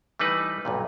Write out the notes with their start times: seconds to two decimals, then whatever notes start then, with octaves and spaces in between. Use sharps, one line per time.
0.19 E3 G3 A3 D#4 B4
0.65 B1 G2 A#2